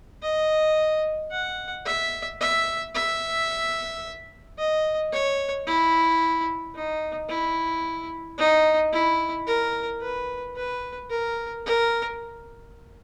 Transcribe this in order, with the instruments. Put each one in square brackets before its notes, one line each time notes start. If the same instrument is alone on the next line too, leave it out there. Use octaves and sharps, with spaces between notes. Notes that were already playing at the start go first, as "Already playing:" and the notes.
[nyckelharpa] D#5
F#5
E5
E5
E5
D#5
C#5
E4
D#4
E4
D#4
E4
A#4
B4
B4
A#4
A#4